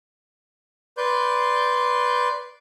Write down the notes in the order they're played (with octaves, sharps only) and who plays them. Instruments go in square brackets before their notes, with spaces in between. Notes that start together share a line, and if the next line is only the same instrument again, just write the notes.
[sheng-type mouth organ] B4 D5 C6 G6